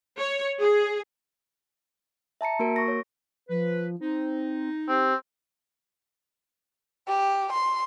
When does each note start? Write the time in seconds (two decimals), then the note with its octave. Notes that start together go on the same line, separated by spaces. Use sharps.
0.18 C#5
0.61 G#4
2.41 E5 A5 A#5 C#7
2.59 A#3 F#4 A#4 D7
2.76 C#6 A#6
2.88 C#5
3.49 F3 B4
4.01 C4 D#4
4.88 C4 G4
7.08 G4
7.53 C6